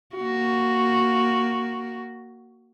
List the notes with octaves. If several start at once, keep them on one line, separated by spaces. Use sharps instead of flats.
A#3 F#4